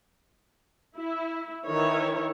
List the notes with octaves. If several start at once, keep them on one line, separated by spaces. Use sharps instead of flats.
E4
D#3 E3 E4 C#5